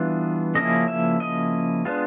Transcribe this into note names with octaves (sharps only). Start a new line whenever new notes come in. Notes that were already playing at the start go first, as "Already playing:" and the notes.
Already playing: E3 G3 B3 D4 F4
C#3 F3 A#3 C#4 E4 D#5
E5
D#5
G#3 B3 D4 F4